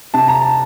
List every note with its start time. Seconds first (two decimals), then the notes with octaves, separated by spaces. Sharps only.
0.14 C3 A5
0.28 A#5
0.41 A5